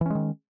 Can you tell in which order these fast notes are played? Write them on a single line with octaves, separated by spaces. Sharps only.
E3 C#4 G#3 D#3